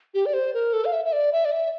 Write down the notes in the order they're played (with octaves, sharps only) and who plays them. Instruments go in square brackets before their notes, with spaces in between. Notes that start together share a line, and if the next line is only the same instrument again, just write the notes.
[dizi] G4
D5
C5
A#4
A4
F5
E5
E5
D5
E5
D5
E5